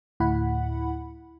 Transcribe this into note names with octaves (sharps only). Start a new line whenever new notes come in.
D2 A2 E4 F#5 B5